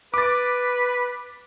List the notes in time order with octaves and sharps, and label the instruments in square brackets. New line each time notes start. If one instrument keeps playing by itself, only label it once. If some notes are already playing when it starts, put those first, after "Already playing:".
[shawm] B4 [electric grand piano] D6 A6